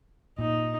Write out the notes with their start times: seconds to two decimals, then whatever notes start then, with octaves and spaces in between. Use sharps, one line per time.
0.38 A#2 D#4